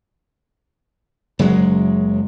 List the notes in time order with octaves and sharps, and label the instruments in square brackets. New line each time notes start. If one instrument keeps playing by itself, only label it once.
[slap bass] F#1 F#3 G#3